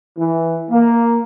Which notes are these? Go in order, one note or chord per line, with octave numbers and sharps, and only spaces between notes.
E3
A#3